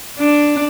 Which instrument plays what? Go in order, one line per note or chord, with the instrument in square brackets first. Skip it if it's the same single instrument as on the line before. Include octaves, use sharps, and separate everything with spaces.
[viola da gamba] D4